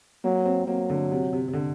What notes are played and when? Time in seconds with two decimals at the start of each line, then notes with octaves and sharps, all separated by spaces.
0.24 F#3 A#3
0.45 C4
0.67 F#3 A#3
0.90 D3
1.11 C3
1.33 C3
1.48 C3
1.53 D3